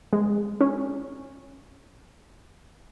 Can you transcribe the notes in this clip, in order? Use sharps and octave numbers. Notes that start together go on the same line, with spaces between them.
G#3
C#4